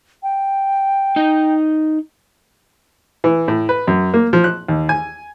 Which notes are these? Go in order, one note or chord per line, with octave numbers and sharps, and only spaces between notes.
G5
D#4 D#5
E3
A2
B4
F#2
A#3
F3
F#6
D#2
G#5